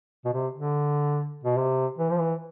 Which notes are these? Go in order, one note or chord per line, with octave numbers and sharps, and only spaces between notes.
B2
C3
D3
B2
C3
E3
F3
E3